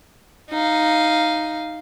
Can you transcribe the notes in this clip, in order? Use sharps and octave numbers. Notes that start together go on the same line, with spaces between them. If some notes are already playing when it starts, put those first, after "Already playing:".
D#4 F5